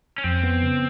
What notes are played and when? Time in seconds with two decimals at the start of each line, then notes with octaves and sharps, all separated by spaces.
0.18 C#4
0.24 F2 C4
0.43 B3
0.63 C#3